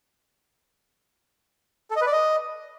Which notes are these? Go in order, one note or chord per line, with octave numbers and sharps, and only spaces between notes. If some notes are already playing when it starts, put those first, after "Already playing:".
A4
D#5
B4
D5
D#5